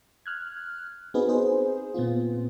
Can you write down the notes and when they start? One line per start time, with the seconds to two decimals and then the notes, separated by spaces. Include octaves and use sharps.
0.26 F6 F#6 G#6
1.14 B3 C4 D#4 F#4 G#4 B4
1.28 D#4 G#4 C5
1.94 A#2 B3 C4 F4